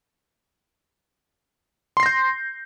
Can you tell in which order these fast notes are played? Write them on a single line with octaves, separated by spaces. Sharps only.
C6 C7 A#6 G6